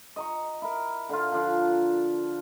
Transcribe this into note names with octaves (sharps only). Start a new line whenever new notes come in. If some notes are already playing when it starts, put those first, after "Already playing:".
D#5 A#5 C#6
E4 A#4
D3 F4
D3 F3 D4 F4